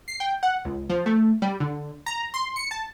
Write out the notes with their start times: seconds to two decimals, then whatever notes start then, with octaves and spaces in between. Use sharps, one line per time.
0.08 C7
0.20 G5
0.43 F#5
0.65 C#2
0.90 F3
1.06 A3
1.42 G3
1.60 D3
2.06 A#5
2.34 C6
2.56 C#7
2.71 A5